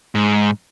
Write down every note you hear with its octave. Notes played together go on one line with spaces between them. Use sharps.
G#2